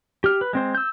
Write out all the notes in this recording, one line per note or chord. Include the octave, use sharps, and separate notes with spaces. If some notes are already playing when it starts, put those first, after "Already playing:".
G4 F6
B4
G#3 C4 C5
E6 G6